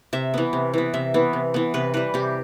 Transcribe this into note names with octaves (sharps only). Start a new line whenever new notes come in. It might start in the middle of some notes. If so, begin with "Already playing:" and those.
C3 E5
E3 B3
C3
E3 B3
C3 E5
E3 B3
C3
E3 B3
C3 B4
E3 G3 B4
C3 G4